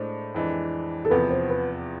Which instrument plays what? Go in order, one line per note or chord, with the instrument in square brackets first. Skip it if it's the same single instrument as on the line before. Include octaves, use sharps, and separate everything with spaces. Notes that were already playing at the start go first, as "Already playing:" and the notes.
Already playing: [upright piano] A2 G#3 D4 [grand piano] C5
[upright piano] F2 E3 G#3 D4
[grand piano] A4
[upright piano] E2 C3 F3 B3 [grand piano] B4
[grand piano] C5
B4